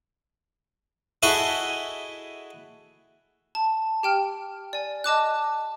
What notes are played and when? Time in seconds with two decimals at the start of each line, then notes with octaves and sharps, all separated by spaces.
1.22 E4 F#4 G#4 A4 D#5 C#6
3.55 A5
4.03 G4 G5 F6
4.73 D5 G#5
5.04 D#5 A5 D6 F#6